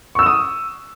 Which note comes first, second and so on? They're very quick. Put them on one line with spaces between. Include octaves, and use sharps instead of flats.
C#6 E6 E7 D#6